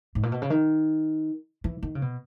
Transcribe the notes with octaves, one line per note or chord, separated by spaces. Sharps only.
G#2
A#2
B2
C#3
D#3
E3
D#3
C#3
B2